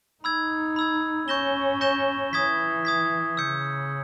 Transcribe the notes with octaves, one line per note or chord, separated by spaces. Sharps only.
D#4 B5 E6 G#6
B5 E6 G#6
C#4 C#6 G6 A#6 E7 G7
C#6 G6 A#6 E7 G7
E3 D#6 G#6 B6
D#6 G#6 B6
C#3 E6 G6 C#7